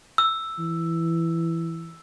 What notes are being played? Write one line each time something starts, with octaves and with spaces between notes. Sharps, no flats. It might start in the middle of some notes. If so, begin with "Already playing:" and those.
E6
E3